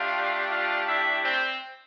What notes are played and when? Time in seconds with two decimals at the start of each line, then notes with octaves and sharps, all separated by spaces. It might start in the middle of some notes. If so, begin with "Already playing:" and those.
Already playing: A3 D4 F4 G4 F5
0.50 F4 F5
0.87 E4 E5
1.24 C4 C5